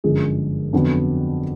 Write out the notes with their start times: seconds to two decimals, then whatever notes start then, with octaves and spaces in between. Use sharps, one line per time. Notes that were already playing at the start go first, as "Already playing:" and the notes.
0.04 G1 F#2 D3 F3 G#3 G#4
0.73 F2 D3 F#3 B3